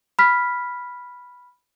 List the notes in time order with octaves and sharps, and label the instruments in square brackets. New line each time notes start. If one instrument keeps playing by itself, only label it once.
[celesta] B5 F6 B6